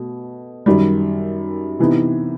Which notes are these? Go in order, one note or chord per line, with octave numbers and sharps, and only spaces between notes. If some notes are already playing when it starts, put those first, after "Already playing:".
Already playing: B2 A3
F#2 D#3 G3
C3 E3 B3 D#4